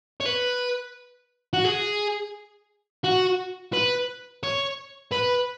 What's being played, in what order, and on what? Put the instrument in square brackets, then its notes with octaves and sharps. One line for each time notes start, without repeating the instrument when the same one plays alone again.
[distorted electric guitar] C#5
B4
F#4
G#4
F#4
B4
C#5
B4